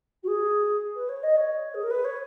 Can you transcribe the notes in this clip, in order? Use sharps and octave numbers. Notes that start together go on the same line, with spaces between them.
F#4
G#4
B4
C#5
D#5
C#5
G#4
A#4
B4
C#5